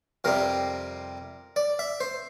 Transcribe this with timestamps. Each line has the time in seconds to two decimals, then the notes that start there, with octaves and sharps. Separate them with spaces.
0.24 F2 C3 G3 C4 A#4
1.56 D5
1.79 E5
2.00 C5